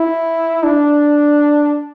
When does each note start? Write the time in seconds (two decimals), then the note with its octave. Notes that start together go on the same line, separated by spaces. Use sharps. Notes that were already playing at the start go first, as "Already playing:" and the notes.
Already playing: E4
0.64 D4